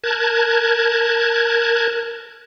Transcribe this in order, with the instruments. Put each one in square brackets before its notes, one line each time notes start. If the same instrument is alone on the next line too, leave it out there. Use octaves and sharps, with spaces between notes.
[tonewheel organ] A#4 A5 F#6 G#6